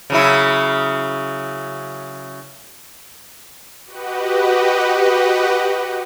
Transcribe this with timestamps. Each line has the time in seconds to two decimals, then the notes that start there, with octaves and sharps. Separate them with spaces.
0.10 C#3 F#3 E4
3.86 F#4 G4 B4 D#5 F#5